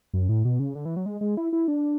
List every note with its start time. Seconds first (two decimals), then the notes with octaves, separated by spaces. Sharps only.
0.14 F#2
0.29 A2
0.45 B2
0.59 C#3
0.75 D3
0.85 E3
0.96 F#3
1.06 G#3
1.21 G#3
1.37 E4
1.53 E4
1.68 D4